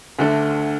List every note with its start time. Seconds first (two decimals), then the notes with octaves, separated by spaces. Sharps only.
0.19 D2 D3 A3